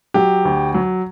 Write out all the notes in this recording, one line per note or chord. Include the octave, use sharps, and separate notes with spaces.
F#3 G4
D2
F#3